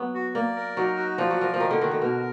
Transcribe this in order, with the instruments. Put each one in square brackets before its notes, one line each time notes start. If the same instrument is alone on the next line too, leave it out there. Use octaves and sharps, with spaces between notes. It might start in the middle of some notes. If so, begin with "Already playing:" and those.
Already playing: [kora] F#3 B3
[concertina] F#4
[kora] A#3 [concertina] D5
[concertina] A#4
[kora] F#3 [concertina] D#4
[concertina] F#4
[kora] F3 [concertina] D5
[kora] F#3
[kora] F3 [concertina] A#4
[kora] F3
[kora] D#3 [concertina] D#4
[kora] D3
[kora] D#3 [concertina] F#4
[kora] D3
[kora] B2 [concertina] A#4